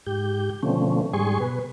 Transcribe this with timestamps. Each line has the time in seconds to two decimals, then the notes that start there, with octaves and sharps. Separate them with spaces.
0.07 G#2 G4 G6
0.63 B2 D3 F3 A3 C4 C#4
1.13 G#2 G3 G#4 G#5 C6 C#6
1.40 B2 B4